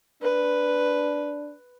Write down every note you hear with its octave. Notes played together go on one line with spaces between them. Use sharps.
D4 B4